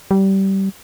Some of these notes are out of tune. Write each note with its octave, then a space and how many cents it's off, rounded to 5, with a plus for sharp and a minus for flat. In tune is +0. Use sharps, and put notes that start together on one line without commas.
G3 -20